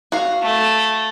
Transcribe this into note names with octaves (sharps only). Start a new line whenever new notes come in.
F#4 F5
A3